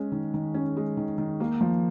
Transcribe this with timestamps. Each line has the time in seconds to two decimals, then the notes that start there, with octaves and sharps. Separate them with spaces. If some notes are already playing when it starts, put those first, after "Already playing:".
Already playing: G#3 C#4
0.12 D#3
0.34 D#3
0.54 C#4
0.77 G#3
0.97 D#3
1.18 D#3
1.40 A#3
1.61 F3